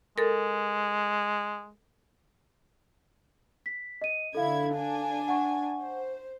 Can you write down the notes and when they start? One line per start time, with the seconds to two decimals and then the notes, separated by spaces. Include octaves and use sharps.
0.18 G#3 A4 A#4
3.66 B6
4.02 D#5 D#7
4.35 D3 E4 A4 F5 G#6
4.74 D4 G#5
5.28 F#5 C#6
5.80 C5